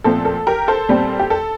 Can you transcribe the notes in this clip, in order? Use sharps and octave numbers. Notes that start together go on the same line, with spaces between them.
A#2 F3 A3 C4 A4
A4
G4 A#4
A4 C5
A#2 G3 C4
G4
A4